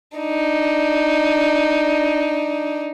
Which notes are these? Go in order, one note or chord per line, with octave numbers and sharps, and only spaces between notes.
D4 D#4